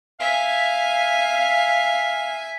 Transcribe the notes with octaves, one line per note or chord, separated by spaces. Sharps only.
E5 F5 G#5